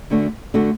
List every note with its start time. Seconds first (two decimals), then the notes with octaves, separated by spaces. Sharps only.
0.10 D2 D3 A3 D4 F#4
0.54 D3 A3 D4 F#4